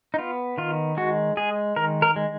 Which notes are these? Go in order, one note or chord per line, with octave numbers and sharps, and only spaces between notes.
D#4
B3 F4
D#3 F4
G#3 F#4
G#3 G#4
D#3 A#4
A#4
G#3